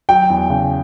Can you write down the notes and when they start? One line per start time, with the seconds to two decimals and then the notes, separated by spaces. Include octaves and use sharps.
0.09 F#3 G5
0.30 E2
0.50 C#3